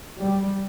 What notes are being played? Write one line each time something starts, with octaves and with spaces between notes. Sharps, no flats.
G3